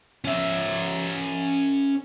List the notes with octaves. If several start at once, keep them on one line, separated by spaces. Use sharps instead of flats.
C#4 E5